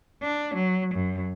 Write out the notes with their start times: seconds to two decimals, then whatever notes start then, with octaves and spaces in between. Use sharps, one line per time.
0.22 D4
0.54 F#3
0.95 F#2